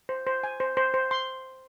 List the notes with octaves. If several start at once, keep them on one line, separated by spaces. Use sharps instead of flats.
C5
C5
G#5
C5
C5
C5
C6